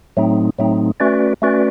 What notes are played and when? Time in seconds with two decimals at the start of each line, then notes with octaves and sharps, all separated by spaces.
0.17 A2 F#3 A3 C4 D#4
0.58 A2 F#3 A3 C4 D#4
1.00 A3 C#4 F#4 B4 D5
1.42 A3 C#4 F#4 B4 D5